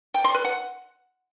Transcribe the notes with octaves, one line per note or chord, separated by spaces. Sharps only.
G5
C6
B4
F#5